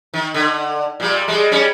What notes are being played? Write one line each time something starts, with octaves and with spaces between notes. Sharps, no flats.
D#3
D3
A#2 G3
G3 G#3
G3 C#4